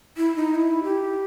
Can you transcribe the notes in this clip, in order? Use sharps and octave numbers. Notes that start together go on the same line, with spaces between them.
E4
D#4
E4
G4